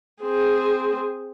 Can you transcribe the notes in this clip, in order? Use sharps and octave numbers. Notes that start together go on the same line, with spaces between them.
C4 G#4